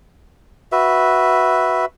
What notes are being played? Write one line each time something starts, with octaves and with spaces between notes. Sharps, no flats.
F#4 B4 E5